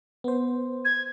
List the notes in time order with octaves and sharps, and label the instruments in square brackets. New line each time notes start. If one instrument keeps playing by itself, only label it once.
[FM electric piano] B3 C5
[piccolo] G#6